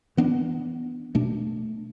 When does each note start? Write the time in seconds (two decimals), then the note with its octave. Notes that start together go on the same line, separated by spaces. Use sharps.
0.17 E3 B3 D4
1.15 B2 A3 D4